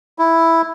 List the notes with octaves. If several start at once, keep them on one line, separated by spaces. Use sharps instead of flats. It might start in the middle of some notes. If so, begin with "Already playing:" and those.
E4